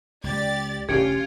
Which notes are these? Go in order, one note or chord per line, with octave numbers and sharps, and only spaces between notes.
C#2 G4 D5 A6
F1 D2 C#4 F4 G4 G#6 C#7 D7